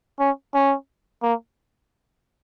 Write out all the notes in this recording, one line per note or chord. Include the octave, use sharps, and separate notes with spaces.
C#4
C#4
A#3